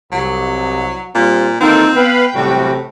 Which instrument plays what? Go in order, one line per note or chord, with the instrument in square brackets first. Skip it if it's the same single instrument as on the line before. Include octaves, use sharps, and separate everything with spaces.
[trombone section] C2 [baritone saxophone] F#3
[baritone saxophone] A#2 [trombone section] G3 C4 F4
[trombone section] D#3 E3 A#3 [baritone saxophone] C4 [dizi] D#4 [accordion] F4 A4
[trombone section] B3 [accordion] B4 F5 B5 [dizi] G5
[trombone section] A1 C3 [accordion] F#2 G3 F#4 [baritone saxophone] A2